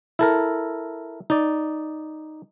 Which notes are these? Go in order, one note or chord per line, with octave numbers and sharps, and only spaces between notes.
E4 A4 A#4
D#4 D5